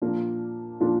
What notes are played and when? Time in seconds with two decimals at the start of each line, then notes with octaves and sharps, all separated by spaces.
0.02 A#2 F3 A#3 D4 F4
0.80 A#2 F3 A#3 D4 F4